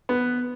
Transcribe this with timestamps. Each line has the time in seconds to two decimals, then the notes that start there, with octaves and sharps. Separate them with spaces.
0.09 B3